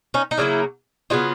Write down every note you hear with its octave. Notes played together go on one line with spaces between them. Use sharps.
C#4 D#4
D#4
C#3 F#3 A#3 D4 E4
C#3 F#3 B3 D#4 F4